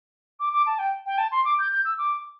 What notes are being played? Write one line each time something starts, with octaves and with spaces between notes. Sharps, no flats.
D6
D6
A5
G5
G5
A5
C6
D6
G6
G6
E6
D6